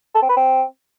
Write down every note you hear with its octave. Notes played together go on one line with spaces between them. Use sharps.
A4
C4
B4
C4